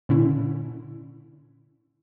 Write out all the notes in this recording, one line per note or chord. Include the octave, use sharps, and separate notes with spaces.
A#2 D3 C#4 E4